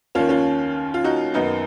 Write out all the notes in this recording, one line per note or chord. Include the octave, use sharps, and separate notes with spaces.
D#2 D#3 C#4 F4
C#4 F4
F4
D#4 F#4
F#2 D#3 B3 D#4